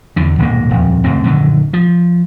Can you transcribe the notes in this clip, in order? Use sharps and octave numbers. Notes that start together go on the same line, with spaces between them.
E2 D3
D#1 B1 G#2 A#3
D#1 F2
C#2 F#2 A3 C4
A#1 F#2 D3 D#3
F3